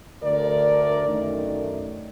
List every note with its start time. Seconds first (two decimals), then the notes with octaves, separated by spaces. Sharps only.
0.22 D2 D3 A3 A#4 D5
1.07 F#2 D#3 A3